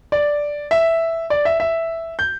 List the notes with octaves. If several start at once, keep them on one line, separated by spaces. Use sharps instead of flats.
D5
E5
D5
E5
E5
G6